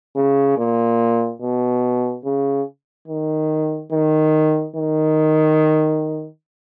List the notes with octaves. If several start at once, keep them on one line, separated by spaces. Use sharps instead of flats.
C#3
A#2
B2
C#3
D#3
D#3
D#3